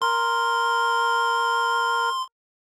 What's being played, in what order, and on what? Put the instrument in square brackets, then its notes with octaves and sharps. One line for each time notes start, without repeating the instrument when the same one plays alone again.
[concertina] A#4 [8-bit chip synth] C6